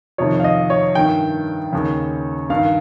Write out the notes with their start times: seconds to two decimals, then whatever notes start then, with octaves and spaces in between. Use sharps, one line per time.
0.18 F2 C3 D#3 C#5
0.40 F5
0.44 D#5
0.70 C#5
0.95 G2 D#3 G5
1.73 D#2 C#3
2.50 G2 D#3 F5